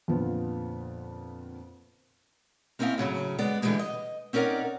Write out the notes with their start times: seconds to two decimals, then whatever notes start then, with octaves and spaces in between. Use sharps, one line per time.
0.08 F2 A#2 D3 B3 F4
2.79 A#3 C4 C#4 E4 D#5 F5
2.98 A2 C#3 E3 F#3
3.38 G#3 B3 D5
3.62 D3 E3 F3 G3 G#3 A#3
3.79 D#5
4.33 C4 C#4 D#4 A#4 D5 F#5